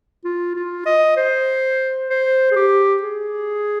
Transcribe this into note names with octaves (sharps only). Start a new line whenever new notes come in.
F4
F4
D#5
C5
C5
G#4
G4
G#4